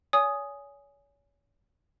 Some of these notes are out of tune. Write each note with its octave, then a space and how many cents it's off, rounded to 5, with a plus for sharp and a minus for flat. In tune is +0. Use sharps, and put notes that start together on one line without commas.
C#5 +40 G#5 +0 D#6 +0